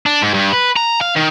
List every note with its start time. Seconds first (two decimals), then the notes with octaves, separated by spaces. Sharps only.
0.06 D4
0.22 G#2
0.34 G2
0.52 B4
0.76 A#5
1.01 F5
1.16 D#3